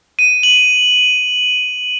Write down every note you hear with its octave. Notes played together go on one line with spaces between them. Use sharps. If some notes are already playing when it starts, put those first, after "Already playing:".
D#7
F#7